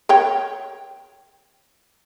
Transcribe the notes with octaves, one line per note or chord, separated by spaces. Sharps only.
A#4 C#5 G5